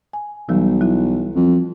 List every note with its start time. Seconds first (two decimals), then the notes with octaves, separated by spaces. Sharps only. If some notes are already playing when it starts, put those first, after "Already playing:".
0.13 G#5
0.49 B1 E3 F#3 G3
0.81 F#3 E4
1.36 F2